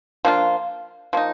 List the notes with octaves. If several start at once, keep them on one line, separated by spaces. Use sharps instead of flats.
F3 A#3 D4 F4
F3 A#3 D#4